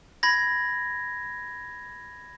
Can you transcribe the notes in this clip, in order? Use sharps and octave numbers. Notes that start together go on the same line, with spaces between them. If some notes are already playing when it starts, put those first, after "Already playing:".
B5 G#6 A#6